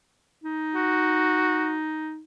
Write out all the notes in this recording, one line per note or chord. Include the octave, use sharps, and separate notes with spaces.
D#4
F#4